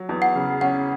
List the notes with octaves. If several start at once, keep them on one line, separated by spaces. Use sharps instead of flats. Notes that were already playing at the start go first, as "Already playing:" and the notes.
Already playing: F#3
E2
F#5
C#3
C#4 F#5